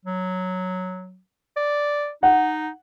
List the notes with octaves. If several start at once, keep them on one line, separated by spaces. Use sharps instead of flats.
F#3
D5
D#4 F#5